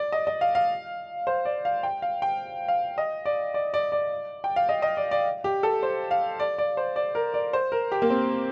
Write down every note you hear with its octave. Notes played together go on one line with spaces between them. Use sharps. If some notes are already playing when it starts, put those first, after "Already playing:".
Already playing: D5
D#5
D#5
F5
F5
C5
D5
F5
G5
F5
G5
F5
D#5
D5
D5
D5
D5
G5
F5
D#5
D#5
D5
D5
G4
A4
C5
F5
D5
D5
C5
D5
A#4
D5
C5
A#4
G4
A#3
C4